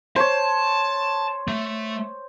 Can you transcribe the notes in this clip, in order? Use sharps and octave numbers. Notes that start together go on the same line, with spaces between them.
C5 C#5 A5
A3